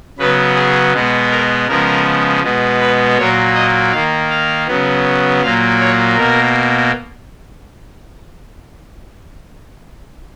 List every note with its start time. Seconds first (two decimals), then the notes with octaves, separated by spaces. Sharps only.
0.19 C#3 F#3 B3 B4
0.55 G#4
0.93 B2 G#3 B3
1.31 A#4
1.68 C#3 F3 G#3 B3 A#4
2.43 B2 G#3 B3
2.80 B4
3.18 A#2 F#3 A#3 C#5
3.55 D#5
3.92 D#3 A#3 F5
4.30 F5
4.67 C#3 F#3 B3
5.42 A#2 F#3 A#3 F5
5.80 C#5
6.17 B2 A#3 A#4